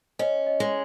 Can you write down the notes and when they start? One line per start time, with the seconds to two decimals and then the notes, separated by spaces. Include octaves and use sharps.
0.19 C#4 D#5
0.46 D#5
0.60 G#3